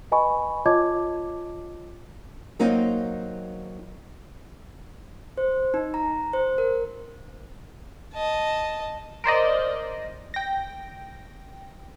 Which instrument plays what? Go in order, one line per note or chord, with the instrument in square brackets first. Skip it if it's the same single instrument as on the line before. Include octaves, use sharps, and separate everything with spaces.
[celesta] B4 D#5 G#5 B5 C#6
F4 C#5 D#5 A5 D6 G#6
[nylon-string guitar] F#3 A#3 C4 D#4
[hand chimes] C5
D#4
A#5
C5
A#4
[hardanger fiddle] D#5 A5
[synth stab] A#4 C5 D5 D#5
G5 A#6